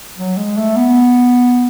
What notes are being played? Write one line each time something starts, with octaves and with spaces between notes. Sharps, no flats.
F#3
G#3
A3
B3